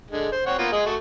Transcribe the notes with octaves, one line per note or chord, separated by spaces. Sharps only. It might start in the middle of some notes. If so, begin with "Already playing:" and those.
D3 G#3
C5
C4 C#5 F#5
A#3 B3 F4
G#3 G#4 D#5
A3 F#4